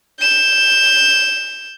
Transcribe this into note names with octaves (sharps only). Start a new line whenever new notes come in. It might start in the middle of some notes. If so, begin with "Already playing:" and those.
G6 E7